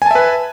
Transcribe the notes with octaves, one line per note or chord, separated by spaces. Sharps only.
B4 E5 G#5 A5